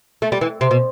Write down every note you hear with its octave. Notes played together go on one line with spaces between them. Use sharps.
A3
G3
E3
C3
B2